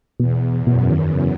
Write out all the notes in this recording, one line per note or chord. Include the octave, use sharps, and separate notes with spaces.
E2 B2
F#2 B2
D#3
C#3